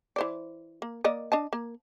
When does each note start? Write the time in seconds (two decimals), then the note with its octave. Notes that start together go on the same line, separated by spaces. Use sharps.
0.16 E3 C5 D5
0.82 A#3
1.04 A#3 D5 D#5
1.32 D4 D#5 A5
1.53 A#3